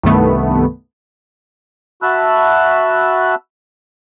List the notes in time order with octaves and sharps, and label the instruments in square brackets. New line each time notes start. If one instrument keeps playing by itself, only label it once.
[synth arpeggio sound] C2 G2 D#3 A3 B3
[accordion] F#4 E5 A5 B5 E6 F#6